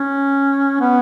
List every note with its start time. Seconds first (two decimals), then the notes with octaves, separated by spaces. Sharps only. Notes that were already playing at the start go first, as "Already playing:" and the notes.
Already playing: C#4
0.81 B3